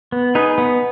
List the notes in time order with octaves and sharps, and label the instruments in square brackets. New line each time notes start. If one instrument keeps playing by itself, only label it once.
[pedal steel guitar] B3
D#4 G#4 B4
B3